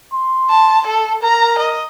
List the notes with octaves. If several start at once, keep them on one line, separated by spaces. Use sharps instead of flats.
C6
A5
A4
A#4 A#5
D#5